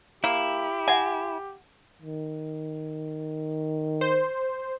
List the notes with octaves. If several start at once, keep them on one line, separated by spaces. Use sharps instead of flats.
A#3 E4 G4
E5 F#5 G#5
D#3
C5